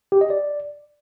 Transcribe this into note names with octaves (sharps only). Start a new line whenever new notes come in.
G4
D#5
D5